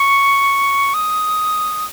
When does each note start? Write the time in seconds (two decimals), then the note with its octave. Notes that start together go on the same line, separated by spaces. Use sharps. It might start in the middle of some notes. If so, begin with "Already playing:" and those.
Already playing: C#6
0.94 D#6